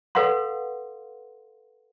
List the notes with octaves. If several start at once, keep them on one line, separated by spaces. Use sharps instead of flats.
A4 B4 F5 F#5 C6